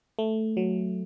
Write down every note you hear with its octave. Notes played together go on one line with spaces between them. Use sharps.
A3
F#3